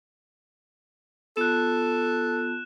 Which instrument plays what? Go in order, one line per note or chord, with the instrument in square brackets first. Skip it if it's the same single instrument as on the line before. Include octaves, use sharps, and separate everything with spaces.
[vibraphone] B3 F4 A5 [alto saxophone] A4 [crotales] F#6 E7